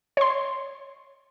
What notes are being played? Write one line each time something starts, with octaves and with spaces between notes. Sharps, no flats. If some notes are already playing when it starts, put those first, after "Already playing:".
C#5 C6